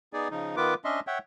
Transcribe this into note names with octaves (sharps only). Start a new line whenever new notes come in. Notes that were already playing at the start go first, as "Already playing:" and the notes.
B3 D#4 G#4 D5
C#3 F3 D#4
D#3 B3 F4 B4 D6
C#4 D4 D#5 E5 C6
C#5 E5 F#5 G5